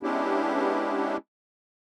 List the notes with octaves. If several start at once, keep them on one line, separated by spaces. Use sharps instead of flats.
G#3 B3 C#4 D4 E4 G4